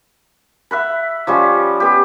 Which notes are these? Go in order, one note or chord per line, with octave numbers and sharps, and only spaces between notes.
E5 F#5 B5
F3 G3 C#4
B3 G4